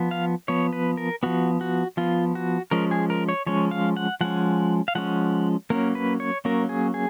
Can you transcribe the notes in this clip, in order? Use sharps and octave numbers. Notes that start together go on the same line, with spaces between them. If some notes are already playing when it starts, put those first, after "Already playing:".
Already playing: F3 B3
F5
F3 B3 C#5
B4
A#4
F3 B3 F#4
F#4
F3 B3 F4
F#4
F3 G#3 C#4 A#4
G#4
A#4
C#5
F3 G#3 C#4 C#5
F5
F#5
F3 G#3 C#4 F#5
F5
F3 G#3 C#4 F#5
F#3 A#3 C#4 A#4
B4
C#5
F#3 A#3 C#4 A#4
G#4
G#4